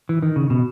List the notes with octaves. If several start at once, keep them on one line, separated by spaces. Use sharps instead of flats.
E3
D#3
C#3
B2